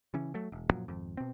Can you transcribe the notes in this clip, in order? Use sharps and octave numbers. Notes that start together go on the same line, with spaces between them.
C#3 E3 C#4
F#3 A3
E1
F#2 A#2 F3 F#3
G#1 F2
B2 C4